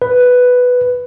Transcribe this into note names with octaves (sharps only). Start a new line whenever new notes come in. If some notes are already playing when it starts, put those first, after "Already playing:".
B4